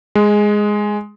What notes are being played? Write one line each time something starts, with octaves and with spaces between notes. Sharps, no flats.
G#3